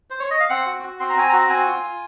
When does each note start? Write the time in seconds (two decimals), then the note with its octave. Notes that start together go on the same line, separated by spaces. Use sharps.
0.10 C5
0.20 C#5
0.31 D#5
0.40 F5
0.49 C4 F#5
0.66 F#4
0.83 F#4
1.00 C4 C6
1.10 A#5
1.16 C4 G#5
1.29 F#4 A#5
1.50 C4 G#5
1.66 F4
1.83 F4